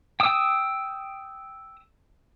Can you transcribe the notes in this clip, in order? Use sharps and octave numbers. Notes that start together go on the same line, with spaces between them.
G5 D#6 E6